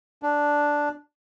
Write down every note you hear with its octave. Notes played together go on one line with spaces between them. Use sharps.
D4